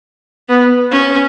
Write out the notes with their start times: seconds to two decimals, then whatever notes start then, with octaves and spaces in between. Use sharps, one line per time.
0.49 B3
0.91 C#4